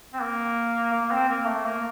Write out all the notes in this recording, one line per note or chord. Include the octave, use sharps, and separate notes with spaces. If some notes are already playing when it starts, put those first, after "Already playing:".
C4
A#3
A#3
C4
A#3
A3
A#3